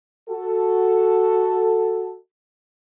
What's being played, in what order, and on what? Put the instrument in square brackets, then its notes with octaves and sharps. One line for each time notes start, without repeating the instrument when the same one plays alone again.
[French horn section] F#4 A4